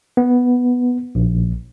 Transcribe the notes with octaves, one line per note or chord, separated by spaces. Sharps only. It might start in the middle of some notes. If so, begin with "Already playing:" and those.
B3
A#1